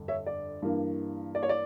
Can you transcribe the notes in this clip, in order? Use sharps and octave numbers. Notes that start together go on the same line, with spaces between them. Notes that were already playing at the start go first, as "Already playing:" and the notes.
Already playing: G1 F2 D3
C#5 E5
D5
G2 E3 A#3
D5
C#5
D5